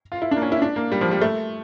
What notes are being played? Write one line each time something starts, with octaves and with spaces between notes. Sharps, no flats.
F4
E4
D4
A#3
C#4
E4
D4
A#3
G3
F3
G3
A3